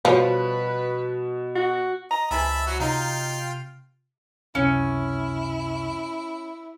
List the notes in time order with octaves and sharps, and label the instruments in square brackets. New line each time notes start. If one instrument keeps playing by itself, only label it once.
[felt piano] B2 [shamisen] F3 G3 C#5 [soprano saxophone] B4
[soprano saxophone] F#4
[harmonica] D#5 [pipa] A#5
[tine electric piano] C#2 [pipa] C3 E3 G#3 [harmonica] E5 A5 B5
[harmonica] F#3 F#4
[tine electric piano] C3 [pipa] F#3 D#4 [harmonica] F4 F5 G5
[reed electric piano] C#2 F#2 C3 [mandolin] C#4 [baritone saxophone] E4